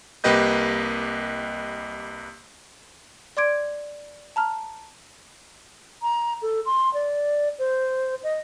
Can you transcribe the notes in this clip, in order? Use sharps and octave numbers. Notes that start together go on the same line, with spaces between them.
C2 A#3 G4 B4 D#5 G6
D5 C6 D6 G#6 D7
A5 A#5 F6
A#5
A4
C6
D5
C5
D#5